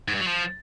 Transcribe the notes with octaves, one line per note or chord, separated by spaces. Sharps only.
G#2
G2
F#3
F3